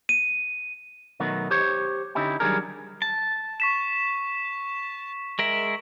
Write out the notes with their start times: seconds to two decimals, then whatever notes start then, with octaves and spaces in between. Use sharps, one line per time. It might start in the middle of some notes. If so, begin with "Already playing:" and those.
0.09 D#7
1.20 B2 D#3 F#3 A3 B3
1.51 G4 C5 C#5
2.15 D3 C#4 D#4 E4 G4
2.40 D#3 F#3 G3 D4 G#4 A#4
3.02 A5
3.60 C#6 B6 E7
5.39 G#3 A#4 E5 F#7